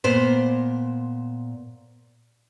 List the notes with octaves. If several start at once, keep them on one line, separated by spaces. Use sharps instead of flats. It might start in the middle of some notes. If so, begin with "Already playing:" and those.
A#2 B3 C5